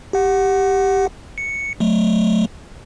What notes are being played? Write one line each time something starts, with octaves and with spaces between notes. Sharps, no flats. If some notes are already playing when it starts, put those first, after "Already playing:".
G4 F#5
C#7
F#3 A3